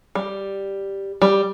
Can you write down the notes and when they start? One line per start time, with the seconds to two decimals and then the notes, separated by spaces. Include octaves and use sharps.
0.15 G3
1.22 G3